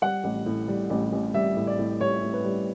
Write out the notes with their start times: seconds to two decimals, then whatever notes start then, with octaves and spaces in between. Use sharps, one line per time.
0.02 G3 F#5
0.24 A1
0.46 A2
0.68 G3
0.90 A1
1.12 A1
1.34 G3 E5
1.57 A2
1.67 D5
1.79 A2
2.00 G3 C#5
2.23 A2
2.34 B4
2.45 G3